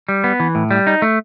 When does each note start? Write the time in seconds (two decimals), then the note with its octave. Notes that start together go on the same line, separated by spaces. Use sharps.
0.09 G3
0.24 B3
0.40 E3
0.55 A2
0.71 G3
0.87 D#4
1.02 A3